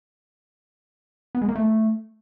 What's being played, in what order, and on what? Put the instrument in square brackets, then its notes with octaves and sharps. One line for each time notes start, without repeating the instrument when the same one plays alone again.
[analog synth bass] B3
G#3
A#3
A3